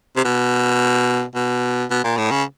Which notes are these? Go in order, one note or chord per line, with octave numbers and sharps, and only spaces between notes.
C3
B2
B2
B2
A#2
A2
C#3